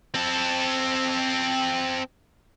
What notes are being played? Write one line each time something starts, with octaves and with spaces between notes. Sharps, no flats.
C4 A4